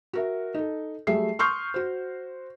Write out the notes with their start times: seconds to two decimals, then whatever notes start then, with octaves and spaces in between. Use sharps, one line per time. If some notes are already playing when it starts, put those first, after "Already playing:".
0.13 F#4 A#4 E5
0.54 D#4 A4
1.07 F#3 G3 A3 G#4 E5 C7
1.39 C6 C#6 D#6 F6 G6 C7
1.74 F#4 C5